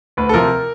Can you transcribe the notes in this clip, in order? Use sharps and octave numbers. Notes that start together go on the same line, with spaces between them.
D2 B4
A4
C3 F3 A#4